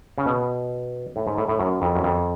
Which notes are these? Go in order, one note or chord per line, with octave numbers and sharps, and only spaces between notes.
C#3
B2
A2
G#2
A2
A2
F#2
F2
F#2
F2